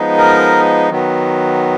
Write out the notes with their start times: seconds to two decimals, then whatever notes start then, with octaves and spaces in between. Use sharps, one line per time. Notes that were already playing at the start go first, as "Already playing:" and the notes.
Already playing: F3 G#3 B3 D#4
0.17 A#4
0.89 D#3 F#3 B3